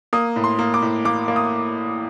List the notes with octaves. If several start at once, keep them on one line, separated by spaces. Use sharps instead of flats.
A#3 D#6
A2
C6
A#3
D6
A2
A#3 D6
A#3
D#6